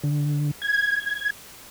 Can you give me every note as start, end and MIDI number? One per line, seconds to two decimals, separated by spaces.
0.03 0.51 50
0.62 1.30 92